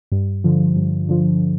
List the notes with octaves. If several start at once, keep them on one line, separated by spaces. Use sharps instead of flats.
G2
D3 F3
G2
D3 F3